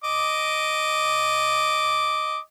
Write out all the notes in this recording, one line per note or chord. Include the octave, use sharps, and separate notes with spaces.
D#5 D6